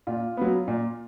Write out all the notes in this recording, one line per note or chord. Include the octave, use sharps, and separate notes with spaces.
A#2 F4
F#3 B3
A#2